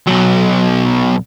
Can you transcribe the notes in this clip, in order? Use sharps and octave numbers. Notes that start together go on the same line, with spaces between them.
B1 F#3